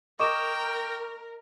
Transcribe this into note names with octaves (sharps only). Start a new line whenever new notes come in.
A#4 D#5 G5 C#6 D6 E7